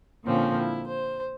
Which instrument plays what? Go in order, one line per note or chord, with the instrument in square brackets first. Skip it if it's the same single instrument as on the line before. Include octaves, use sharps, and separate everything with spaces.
[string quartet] A#2 D3 F3 C4 C#4
E4
C5